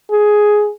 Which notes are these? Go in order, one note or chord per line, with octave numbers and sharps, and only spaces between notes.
G#4